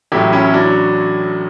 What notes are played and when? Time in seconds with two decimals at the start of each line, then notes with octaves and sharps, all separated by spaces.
0.12 A1 A2 F#3 E4 G4
0.32 C#4 E4
0.53 D4 F#4